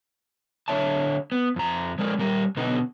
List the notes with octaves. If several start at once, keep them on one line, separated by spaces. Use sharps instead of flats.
D3 C#5 E5 A5
B3
F2 A#5
F3 G#3 A#4 D5
A#2 G3 A#4
B2 D3 B3 D#4